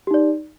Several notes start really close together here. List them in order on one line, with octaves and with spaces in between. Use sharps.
G4 D#4 D5